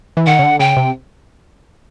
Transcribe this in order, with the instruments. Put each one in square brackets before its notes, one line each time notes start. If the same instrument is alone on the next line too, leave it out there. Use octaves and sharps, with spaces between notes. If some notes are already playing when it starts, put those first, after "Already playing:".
[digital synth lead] E3
[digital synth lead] D#3 [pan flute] F#5
[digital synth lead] C#3
D3
[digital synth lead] C#3 [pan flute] G5
[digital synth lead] C3